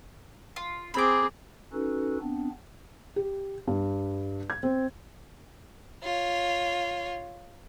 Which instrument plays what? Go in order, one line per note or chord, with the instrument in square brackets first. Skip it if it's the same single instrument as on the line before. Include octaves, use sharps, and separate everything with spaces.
[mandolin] F4
[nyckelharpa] C4 G#4 [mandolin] B5 D6
[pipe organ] C#4 D#4 F#4 A4 B4
B3 C4 D4
[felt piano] G4
G2
G#6
C4
[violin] F4 C#5